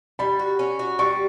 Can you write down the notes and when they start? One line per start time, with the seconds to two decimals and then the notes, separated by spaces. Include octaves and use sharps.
0.19 G3 B5
0.39 F#4
0.59 C#4
0.79 F#4
0.99 G3 C#6